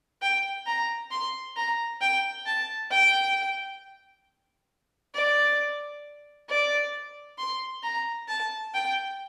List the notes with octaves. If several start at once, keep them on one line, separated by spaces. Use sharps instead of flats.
G5
A#5
C6
A#5
G5
A5
G5
D5
D5
C6
A#5
A5
G5